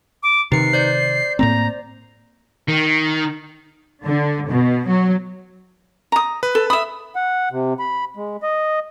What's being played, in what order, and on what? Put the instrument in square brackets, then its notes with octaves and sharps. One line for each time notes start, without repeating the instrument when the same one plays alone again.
[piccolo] D6
[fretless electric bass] C3 D#3 [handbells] D#4 B4 C#7 [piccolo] C7
[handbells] C5 D5 G6
[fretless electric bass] A2 A#3 C4 [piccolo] A#5
[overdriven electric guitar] D#3
[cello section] D3
B2
F#3
[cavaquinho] A#5 D#6
[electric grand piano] B4
[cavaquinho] A4
[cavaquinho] E5 D#6 [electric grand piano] B5
[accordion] F#5
C3
B5
G#3
D#5